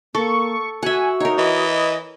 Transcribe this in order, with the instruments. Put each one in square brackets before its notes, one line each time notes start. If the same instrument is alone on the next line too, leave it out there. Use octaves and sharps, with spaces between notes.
[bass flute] A#3 [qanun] A4 [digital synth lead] C#6
[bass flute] F#4 [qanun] E5 F#5 [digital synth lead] G#5
[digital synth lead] D#4 [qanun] A#4 C#5
[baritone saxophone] E3 [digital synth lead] D#5